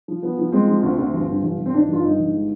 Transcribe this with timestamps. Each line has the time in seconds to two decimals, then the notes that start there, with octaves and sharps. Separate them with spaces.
0.08 F3
0.23 F3 B3
0.39 F3
0.52 G#3 C4
0.67 F3
0.83 D2
0.98 D2
1.14 G1
1.28 G2
1.43 G1
1.59 G1
1.66 C4
1.74 D#3 D4
1.88 G1 F4
2.03 G2 D#4
2.19 G1
2.34 G#3